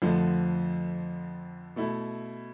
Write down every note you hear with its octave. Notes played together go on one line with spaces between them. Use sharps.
F2 D3 F3 A3
B2 A3 E4